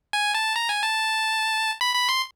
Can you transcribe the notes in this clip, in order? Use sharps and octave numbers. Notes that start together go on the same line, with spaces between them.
G#5
A5
A#5
G#5
A5
B5
B5
C6